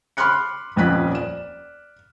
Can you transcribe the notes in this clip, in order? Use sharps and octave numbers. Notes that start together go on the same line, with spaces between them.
B5 C6 D6 F6 F#6 C#7
D#1 F2 C#4 F#6 B6
D5 E7